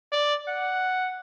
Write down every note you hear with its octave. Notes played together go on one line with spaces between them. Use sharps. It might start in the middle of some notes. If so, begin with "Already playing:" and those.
D5
F#5